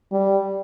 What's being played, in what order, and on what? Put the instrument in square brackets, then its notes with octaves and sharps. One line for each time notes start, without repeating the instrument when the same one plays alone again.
[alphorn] G3